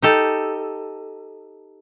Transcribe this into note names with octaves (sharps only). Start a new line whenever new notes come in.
D#4 G4 A4